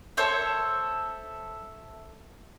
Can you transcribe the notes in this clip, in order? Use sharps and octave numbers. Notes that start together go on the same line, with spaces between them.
A4 C5 C#5 E5